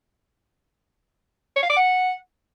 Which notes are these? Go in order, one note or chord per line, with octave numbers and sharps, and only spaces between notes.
C#5
F5
D6
F#5